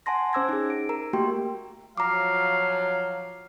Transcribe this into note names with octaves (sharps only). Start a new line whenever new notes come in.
F#5 G#5 A5 C6 A#6
C#4 C5 D6 E6 G#6 A#6
D#4 G#4
D7
A#4 A#5
A3 A#3 F#4 G4 G5 C6
F3 F#3 F5 A#5 D6